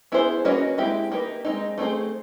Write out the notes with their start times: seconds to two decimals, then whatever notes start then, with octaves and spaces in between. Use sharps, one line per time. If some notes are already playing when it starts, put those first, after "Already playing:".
0.12 B3 E4 G#4 C5
0.45 A#3 C#4 F#4 B4 D#5
0.78 G#3 C4 E4 G4
1.12 A#3 D#4 G4 B4
1.45 G#3 C4 D#4
1.78 A3 C4 D#4 G#4 C5